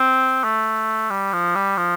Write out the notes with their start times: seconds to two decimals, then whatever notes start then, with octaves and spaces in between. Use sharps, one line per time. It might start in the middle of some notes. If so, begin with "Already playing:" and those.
Already playing: C4
0.44 A3
1.11 G3
1.33 F3
1.55 G3
1.78 F3